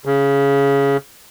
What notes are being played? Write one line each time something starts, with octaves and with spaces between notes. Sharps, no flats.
C#3